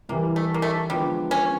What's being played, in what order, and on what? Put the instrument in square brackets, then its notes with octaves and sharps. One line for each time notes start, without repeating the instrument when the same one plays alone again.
[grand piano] C2 C3 E3 G3 [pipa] A#3
[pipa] A3
A#3
A3
[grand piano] D3 F3 G#3 B3 [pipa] G3
[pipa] C#4